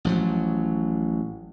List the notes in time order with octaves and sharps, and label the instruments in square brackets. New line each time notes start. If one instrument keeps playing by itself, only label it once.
[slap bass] A1 F3 F#3